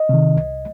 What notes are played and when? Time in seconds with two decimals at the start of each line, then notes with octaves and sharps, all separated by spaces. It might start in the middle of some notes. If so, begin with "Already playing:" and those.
Already playing: D#5
0.09 C3 D#3
0.37 C2